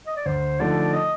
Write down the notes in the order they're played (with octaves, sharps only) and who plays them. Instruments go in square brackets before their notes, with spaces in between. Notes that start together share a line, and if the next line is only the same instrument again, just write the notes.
[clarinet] D#5
D5
[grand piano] D2 [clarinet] C5
[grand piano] D3 F3 A3 D#4 [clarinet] D5
[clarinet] D#5